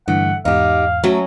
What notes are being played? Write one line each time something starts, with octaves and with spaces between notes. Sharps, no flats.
G2 D3 E3 A3 F#5
E2 G#2 D#4 G4 F5
F#3 A3 C#4 A#4 E5